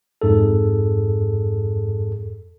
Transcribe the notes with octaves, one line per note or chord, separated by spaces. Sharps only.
F2 G#2 G#4 A4